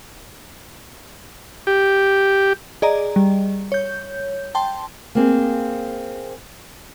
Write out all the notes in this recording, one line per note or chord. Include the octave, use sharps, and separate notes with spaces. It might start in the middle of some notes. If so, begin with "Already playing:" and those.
G4
G#4 D5 D#5 A#5
G3
C#5 G6
G5 A5 C6
A#3 C4 G#4